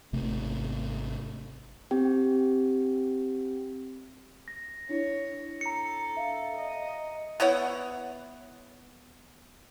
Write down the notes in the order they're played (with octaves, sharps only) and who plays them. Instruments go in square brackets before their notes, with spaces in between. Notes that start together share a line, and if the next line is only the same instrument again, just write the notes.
[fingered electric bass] G#1 C3 A3
[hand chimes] C4 G4 G5
[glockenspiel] A#6
[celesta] D4 E4 [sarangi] C#5
[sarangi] A4 [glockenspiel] A#5 C#7
[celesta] E5 F5
[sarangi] D#5
[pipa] B3 E4 C#5 F#5